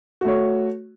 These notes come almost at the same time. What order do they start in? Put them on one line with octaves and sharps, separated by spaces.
F#4 A3 C#5